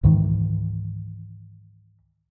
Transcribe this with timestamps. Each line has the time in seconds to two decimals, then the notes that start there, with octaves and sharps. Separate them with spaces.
0.03 C#2 G#2 D#3 E3